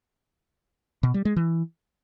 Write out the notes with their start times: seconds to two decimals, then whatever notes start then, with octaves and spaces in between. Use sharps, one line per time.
1.03 B2
1.14 G3
1.25 G#3
1.36 E3